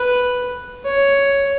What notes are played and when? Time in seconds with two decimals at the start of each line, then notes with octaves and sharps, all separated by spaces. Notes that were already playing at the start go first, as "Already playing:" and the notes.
Already playing: B4
0.85 C#5